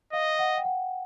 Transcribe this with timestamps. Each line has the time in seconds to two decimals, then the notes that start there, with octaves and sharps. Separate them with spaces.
0.13 D#5 F5
0.39 F#5
0.57 G5
0.65 F#5